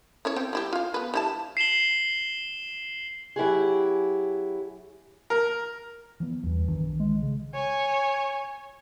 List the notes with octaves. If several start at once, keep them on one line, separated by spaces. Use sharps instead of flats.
C#4 E4 C#5
C4 C5 G5
G3 E4 G4
F4 F5
B3 B4
G3 E4 A5
C7 E7 F#7 G7
F#3 E4 G4 G#4
A#4
E3 F3 B3
E2 G2 E3
B1 D#3 D4
G#3
C#3
C#5 G#5